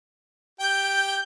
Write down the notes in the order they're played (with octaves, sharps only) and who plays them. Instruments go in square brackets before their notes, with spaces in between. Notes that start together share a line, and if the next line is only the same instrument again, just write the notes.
[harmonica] G4 G5 [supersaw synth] G6